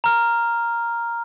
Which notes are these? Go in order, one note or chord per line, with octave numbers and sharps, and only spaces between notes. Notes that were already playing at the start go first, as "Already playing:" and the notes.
A#5 F6